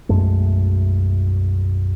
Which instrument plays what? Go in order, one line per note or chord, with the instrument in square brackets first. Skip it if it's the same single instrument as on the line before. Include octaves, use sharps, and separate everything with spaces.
[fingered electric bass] B1 F#2 G#3 A3